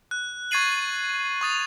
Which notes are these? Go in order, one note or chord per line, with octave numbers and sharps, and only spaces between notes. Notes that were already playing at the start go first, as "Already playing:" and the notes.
F#6
C#6 G#6 A6 C7 D#7 F#7
C#6 D#6 A6 F7